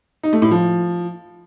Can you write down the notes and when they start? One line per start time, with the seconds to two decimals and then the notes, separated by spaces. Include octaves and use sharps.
0.23 D#4
0.33 A3
0.42 A2
0.51 F3